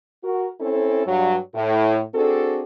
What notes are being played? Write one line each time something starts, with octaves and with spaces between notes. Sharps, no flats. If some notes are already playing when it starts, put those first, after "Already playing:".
F#4 A#4
C4 C#4 E4 A4
G2 F#3
A2
C4 D4 F#4 G#4 A4